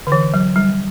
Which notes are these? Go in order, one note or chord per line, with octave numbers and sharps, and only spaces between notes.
D3
E3
F#3
G3